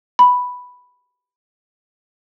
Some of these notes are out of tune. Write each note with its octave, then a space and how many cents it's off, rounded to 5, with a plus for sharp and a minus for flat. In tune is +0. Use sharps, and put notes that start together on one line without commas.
B5 +0